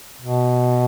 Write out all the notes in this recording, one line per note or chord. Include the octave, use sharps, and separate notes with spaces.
B2